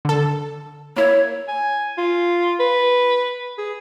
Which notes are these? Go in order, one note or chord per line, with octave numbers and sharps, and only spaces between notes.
D3 A4
A#3 E4 C#5
G#5
F4
B4
G#4